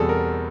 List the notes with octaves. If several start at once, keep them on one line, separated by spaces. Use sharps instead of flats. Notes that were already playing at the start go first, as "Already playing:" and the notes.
Already playing: E2 B2 G3 C4 G#4 A4
A#4